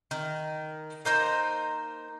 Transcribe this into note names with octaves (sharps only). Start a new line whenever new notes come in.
D#3
A#3 D#4 C5 A#5